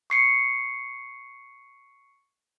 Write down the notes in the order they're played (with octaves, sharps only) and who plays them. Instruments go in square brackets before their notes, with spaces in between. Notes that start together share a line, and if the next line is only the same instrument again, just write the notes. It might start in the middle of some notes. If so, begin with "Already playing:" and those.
[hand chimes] C#6 C7 C#7